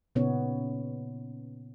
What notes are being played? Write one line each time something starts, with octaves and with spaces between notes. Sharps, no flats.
A#2 C#3 B3 C#4 D#4 C#5